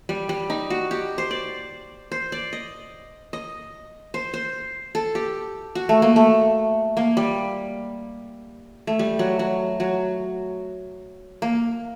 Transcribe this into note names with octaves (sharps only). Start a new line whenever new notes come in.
G3
G3
D#4
F#4
G4
C5
D5
C5
D5
D#5
D#5
C5
C5
A4
G4
F#4
A3
A#3
A3
A#3
G3
A3
G3
F#3
F#3
F#3
A#3